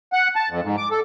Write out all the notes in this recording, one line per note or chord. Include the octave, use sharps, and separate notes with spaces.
F#5
A5
F2
G#2
D6
A4